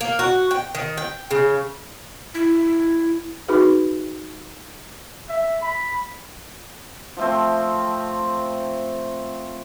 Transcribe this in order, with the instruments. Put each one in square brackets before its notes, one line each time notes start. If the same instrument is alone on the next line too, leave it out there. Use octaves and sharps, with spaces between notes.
[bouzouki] A#3
F#4
G5
D#3
G5
C#3
[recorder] E4
[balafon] D#4 F#4 G#4 B4
[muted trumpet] E5
B5
[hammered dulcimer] F3 A3 C4